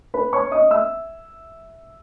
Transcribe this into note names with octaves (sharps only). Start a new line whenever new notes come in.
B4 B5
C#5 C#6
D#5 D#6
E5 E6